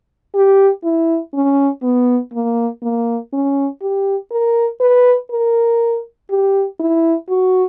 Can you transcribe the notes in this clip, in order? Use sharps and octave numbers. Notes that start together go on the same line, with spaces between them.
G4
E4
C#4
B3
A#3
A#3
C#4
G4
A#4
B4
A#4
G4
E4
F#4